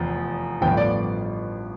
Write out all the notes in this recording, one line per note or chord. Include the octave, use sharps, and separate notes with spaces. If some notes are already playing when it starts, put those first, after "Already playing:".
Already playing: F1 E2 F3
A1 G2 D3 F3 B3 G5
D5